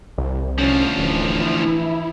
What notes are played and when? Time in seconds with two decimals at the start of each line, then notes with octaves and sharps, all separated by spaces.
0.18 C2
0.58 D2 F3 C#4
0.98 D1 E3
1.41 E4